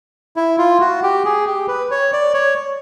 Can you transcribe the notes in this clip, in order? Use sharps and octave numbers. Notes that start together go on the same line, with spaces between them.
E4
F4
F#4
G4
G#4
G4
B4
C#5
D5
C#5